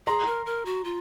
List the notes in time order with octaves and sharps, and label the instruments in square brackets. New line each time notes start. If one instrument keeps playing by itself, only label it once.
[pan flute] G#4 [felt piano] A#5 C6
[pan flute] A#4
A#4
F#4
F4